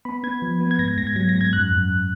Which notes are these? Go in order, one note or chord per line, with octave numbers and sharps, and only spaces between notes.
B3 B5
B3 G#6
F3
B3
G#6
G#2 A#6
G#6
G#2 A#6
G#6
F#3 A#6
A#6
G#2
G#6
F#2 F#6
F#2
F#2